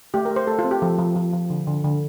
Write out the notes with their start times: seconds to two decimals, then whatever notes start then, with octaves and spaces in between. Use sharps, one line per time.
0.14 A3 G4
0.25 A#4
0.31 A3
0.36 C5
0.47 A3 A4
0.59 F4
0.64 C4
0.71 G4
0.82 F3 A4
0.99 F3
1.16 F3
1.33 F3
1.50 D3
1.67 D3
1.84 D3